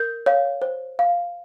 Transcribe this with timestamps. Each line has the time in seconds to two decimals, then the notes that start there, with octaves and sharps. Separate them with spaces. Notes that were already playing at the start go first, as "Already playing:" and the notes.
Already playing: A#4 G6
0.26 C#5 F5
0.62 C5
0.99 F5